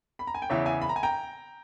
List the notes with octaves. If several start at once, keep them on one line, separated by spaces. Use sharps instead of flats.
B5
A#5
G#5
G5
E2 C#3 E3 C#5 E5
E5 G#5
B5
A#5
G#5
G5 A#5